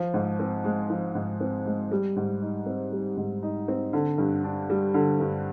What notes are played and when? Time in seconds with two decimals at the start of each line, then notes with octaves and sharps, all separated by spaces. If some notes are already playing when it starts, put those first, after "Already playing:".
Already playing: F3
0.14 G#2
0.39 C4
0.64 G#3
0.90 F3
1.15 G#2
1.40 C4
1.66 G#3
1.91 G3
2.16 G#2
2.42 D#4
2.66 C4
2.92 G3
3.17 G#2
3.43 D#4
3.68 C4
3.93 D3
4.18 G2
4.44 D4
4.70 G3
4.94 D3
5.20 G2